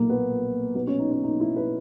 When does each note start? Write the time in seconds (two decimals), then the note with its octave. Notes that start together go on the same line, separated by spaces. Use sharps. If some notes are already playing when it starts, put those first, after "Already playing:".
Already playing: B1 A#2 A#3
0.10 B3
0.75 B1 B2 B3
0.87 C#4
0.99 D#4
1.11 C#4
1.24 D#4
1.40 E4
1.56 B4